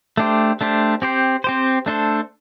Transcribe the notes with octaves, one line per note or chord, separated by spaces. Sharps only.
A3 D4 G4 C5
A3 D4 G4 C5
C4 G4 C5
C4 G4 C5
A3 D4 A4 C5